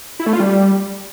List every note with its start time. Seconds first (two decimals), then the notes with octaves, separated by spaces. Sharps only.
0.20 E4
0.26 A3
0.33 F4
0.40 G3